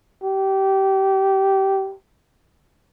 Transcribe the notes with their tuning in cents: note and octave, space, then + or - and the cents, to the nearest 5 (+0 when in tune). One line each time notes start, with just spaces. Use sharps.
G4 -20